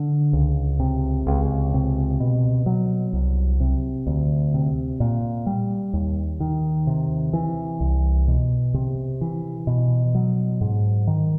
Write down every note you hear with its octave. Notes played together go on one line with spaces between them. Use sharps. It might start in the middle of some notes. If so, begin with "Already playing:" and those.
Already playing: D3
C#2
C3
C#2
C3
B2
F#3
C2
C3
D2
C3
A#2
G3
D#2
D#3
C3
E3
C2
B2
C3
E3
B2
F#3
G#2
D#3